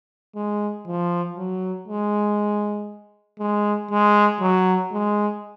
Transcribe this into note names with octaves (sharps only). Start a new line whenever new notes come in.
G#3
F3
F#3
G#3
G#3
G#3
F#3
G#3